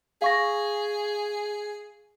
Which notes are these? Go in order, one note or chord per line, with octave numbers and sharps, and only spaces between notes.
G#4 F5 C#6 A#6